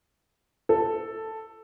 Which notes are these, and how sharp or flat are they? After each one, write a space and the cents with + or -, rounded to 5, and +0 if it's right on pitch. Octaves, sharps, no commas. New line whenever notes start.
A4 +5